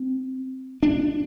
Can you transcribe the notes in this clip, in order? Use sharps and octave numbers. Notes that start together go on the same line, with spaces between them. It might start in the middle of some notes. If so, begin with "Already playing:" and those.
Already playing: C4
D4